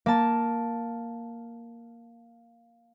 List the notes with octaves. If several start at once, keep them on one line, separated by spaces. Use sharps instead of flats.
A#3 A5